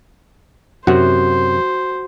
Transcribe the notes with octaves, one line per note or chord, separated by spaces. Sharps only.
F#2 C3 F#4 C5